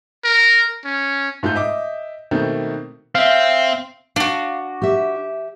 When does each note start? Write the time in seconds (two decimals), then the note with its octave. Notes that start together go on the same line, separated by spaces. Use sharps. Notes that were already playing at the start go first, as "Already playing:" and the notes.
0.24 A#4
0.85 C#4
1.43 G#2 A3 F4 A4 G6
1.55 D#5 E5 D6
2.31 B2 D#3 A3 A#3 C4
3.15 C4 E5 F5
4.16 D4 F#4 F5
4.82 G4 E5